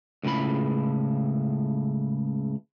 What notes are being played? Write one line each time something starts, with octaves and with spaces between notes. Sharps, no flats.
C#2 A2 C#3 E4 B5